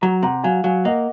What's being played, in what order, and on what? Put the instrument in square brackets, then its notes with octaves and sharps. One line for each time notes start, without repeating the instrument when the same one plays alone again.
[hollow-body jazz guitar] F#3 [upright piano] F#5 A#5
[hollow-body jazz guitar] C3 [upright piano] F#5 A#5
[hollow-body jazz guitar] F#3 [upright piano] F5 G#5
[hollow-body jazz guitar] F#3 [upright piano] F5 G#5
[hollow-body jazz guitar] A#3 [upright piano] D#5 F#5